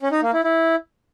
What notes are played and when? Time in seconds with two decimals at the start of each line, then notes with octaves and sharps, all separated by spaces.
0.01 C#4
0.12 D#4
0.22 A#3
0.33 E4
0.44 E4